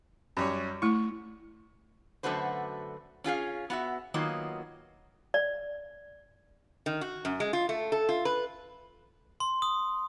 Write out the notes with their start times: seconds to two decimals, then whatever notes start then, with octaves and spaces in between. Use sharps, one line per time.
0.37 F#2 G3 C#5
0.82 A3 E4 C#6
2.23 F#2 D3 A3 F#4 B4 C5
3.24 C#4 F4 G#4 F5
3.70 B3 F#4 E5
4.14 D#3 F#3 A#3 B3 F4 D#5
5.34 D5
6.86 D#3
7.01 F#4
7.25 F#2
7.40 G#3
7.53 F4
7.69 A3
7.92 A4
8.09 F4
8.25 B4
9.40 C6
9.62 D#6